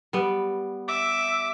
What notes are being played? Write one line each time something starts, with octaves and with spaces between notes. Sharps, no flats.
G3 B3
E5 D6